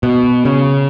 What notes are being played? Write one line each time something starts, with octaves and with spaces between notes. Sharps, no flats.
B2
C#3